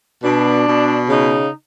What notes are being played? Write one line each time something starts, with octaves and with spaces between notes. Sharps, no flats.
B2 D4
B2
C#3 D#4